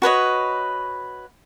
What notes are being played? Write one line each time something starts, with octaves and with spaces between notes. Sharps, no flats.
F#4 B4 C#5 D#5